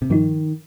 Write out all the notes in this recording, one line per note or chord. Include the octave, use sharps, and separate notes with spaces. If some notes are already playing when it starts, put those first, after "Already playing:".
C3
G2 D#3 F3 D#4